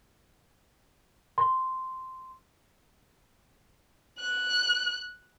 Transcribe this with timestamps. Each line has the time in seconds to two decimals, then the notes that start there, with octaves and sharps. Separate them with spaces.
1.38 C6
4.18 F#6